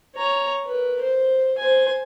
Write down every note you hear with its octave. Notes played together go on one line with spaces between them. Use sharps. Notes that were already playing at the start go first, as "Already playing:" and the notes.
C#5 A#5
A#4 B4
C5
C5 G#5